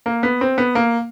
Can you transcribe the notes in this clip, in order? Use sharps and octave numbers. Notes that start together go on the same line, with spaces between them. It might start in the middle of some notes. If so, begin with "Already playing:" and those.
A#3
B3
C4
B3
A#3